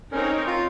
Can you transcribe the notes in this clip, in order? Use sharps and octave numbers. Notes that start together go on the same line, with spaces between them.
C4 C#4 D#4 A#4 C#5
F4